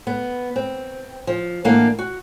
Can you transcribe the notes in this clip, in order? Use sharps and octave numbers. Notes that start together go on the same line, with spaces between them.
B3
C4
F3
A2 E3 A#3 D4 F5 F#5
F#4